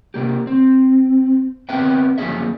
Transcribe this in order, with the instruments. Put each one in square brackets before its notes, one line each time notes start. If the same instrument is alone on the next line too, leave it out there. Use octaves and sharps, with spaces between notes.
[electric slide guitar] C3 A#3 G4
C4
B3 C4 B4 E5 G5
F3 F#3 A#3 C#4 G#4 E5